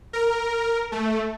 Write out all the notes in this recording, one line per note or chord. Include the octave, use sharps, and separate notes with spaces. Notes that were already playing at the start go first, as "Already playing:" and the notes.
A#4
A3